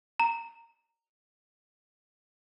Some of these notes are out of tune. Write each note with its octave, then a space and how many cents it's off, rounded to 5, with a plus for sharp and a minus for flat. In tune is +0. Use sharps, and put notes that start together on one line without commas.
A#5 -15